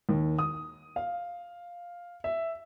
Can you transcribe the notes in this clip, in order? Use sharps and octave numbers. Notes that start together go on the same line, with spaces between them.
D#2
D#6
F5
E5